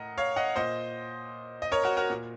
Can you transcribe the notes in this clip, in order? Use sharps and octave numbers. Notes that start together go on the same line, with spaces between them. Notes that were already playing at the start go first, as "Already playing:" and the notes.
Already playing: A2 A#4 D#5 F#5
C#5 F5
D#5 F#5
A#2 C5 D#5
D#5
A#4 C#5
F#4 A#4
F#4 A#4
A#2